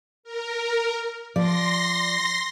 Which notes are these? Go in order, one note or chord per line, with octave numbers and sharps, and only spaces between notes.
A#4
F3 D5 C6 A#6